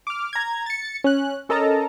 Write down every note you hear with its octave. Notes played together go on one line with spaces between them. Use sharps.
D6 F6
A#5 G#6
A6 C#7
C#4 F#6
C#4 A4 A#4 D#5 A5 A#5